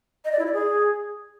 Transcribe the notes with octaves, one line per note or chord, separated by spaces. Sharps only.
D#5
D5
E4
D5
G#4